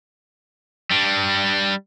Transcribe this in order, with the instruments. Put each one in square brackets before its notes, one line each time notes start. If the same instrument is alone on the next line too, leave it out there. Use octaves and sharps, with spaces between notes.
[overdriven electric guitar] G3 D4